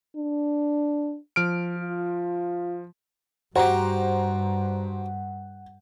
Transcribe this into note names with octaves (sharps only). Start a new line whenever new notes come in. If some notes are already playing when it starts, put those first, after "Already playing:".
D4
F3 F6 D7
F4
G2 F#4 G4 C5 F#5 A#5